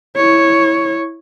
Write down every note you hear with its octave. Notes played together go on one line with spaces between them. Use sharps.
E4 C#5